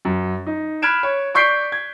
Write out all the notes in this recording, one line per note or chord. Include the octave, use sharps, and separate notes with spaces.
F#2
D#4
B5 F6 F#6 G#6 D7 E7
C#5
D5 C#6 G6 B6 C7 D7
G#6